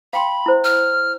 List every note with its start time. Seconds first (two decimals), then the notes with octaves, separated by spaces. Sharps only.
0.13 F5 G5 B5 C6
0.46 E4 C5
0.64 F6